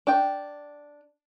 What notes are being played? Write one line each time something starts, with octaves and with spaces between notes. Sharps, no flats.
D4 G5